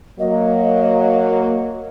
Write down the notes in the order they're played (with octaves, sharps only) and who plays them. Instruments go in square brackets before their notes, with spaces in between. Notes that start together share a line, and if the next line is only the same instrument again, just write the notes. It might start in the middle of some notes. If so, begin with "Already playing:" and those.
[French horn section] F#3 A#3 [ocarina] D#5